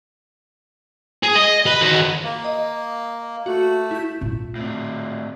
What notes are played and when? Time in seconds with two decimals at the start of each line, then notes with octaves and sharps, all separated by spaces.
1.23 G#4
1.36 D#5
1.66 B4
1.81 D#3 F#4
2.23 A#3
2.44 D#5
3.46 A3 F#4
3.91 E4 G6
4.21 A#2 F4
4.56 A2 C4